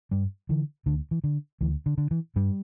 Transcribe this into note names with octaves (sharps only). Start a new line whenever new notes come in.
G2 G3
D3 E3
D2 D3
E3
D3
D2 E3
D3
D3
E3
G2 G3